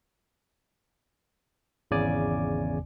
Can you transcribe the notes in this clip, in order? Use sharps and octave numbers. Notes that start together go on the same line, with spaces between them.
G#1 E2 C#3 D5 G#5 D6